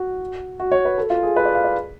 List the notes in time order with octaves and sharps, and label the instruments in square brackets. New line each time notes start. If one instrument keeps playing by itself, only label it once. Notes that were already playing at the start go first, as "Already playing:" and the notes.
Already playing: [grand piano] F#4
F#4
C#5
B4
A4
F4
G#4
B4
D5
F5
D5